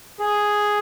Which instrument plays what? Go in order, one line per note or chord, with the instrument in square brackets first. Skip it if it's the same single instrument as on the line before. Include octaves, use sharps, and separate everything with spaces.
[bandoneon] G#4